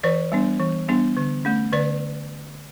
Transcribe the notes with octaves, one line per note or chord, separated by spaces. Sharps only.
E3 B4 D5
G3 B3 D4
E3
G3 B3 D4
D3
A3 C#4
D3 B4 D5